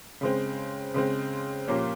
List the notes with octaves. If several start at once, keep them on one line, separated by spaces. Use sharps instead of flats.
C#3 G#3 C4
C#3 G#3 C4
A#2 F3 A#3 C#4 G4